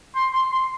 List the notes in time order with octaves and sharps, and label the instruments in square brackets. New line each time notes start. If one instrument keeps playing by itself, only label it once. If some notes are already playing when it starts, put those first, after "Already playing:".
[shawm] C6
C6
C6